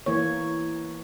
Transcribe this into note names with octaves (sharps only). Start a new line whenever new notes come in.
E3 A#3 C#5